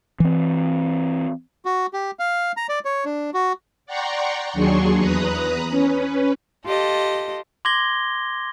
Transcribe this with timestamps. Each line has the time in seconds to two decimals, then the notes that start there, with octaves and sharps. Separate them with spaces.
0.20 E3 C4
1.65 F#4
1.93 G4
2.19 F5
2.57 A#5
2.69 D5
2.85 C#5
3.05 D4
3.34 F#4
3.86 D5 F#5 G5 A#5 C6 C#6
4.53 D#2 F#3 D4 G#4 C6 C#6
4.98 E2 B4 A#5 D#6 F#6
5.70 C#4 B4
6.65 F4 G4 A4 D#5
7.65 C6 D6 G#6 A#6 G7